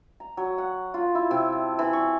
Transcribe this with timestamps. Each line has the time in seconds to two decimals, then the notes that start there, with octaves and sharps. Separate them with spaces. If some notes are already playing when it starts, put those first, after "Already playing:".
0.20 A#5
0.37 F#3
0.58 F#5
0.94 F4
1.15 E4
1.31 C3
1.52 A5
1.79 E3
1.93 C#6